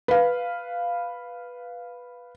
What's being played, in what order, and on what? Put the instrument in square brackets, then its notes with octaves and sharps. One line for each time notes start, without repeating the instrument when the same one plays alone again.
[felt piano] B4 F5